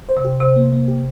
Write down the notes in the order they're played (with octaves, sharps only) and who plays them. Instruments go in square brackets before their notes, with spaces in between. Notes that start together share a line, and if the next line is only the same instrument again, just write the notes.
[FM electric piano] C5
[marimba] C3
[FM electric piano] G4
[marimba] C3 [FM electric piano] C5
[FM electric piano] A#3
A#3
G4